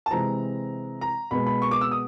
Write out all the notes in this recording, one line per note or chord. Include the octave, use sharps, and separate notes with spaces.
A5
C3 E3 G#3 C4 A#5
A#5
B2 G#3 B3 B5
B5
C#6
D6
E6
D#6